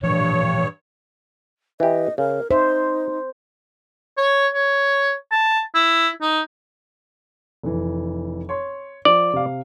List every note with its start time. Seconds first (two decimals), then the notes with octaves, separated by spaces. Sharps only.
0.03 G2 A#2 E3 F3 C#5
1.80 E3 G4 D#5
2.18 C#3 A#4
2.51 D#4 C5 E5
4.18 C#5
4.54 C#5
5.32 A5
5.75 E4
6.22 D#4
7.63 F1 E3
8.49 C#5 C6
9.05 F3 D5
9.33 C3 F5